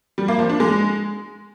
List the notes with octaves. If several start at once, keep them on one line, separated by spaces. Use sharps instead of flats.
G3
A#3
F3
D4
G#3